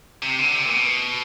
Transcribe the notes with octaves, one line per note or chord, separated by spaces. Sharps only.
C3
D3
C3
A#2
B2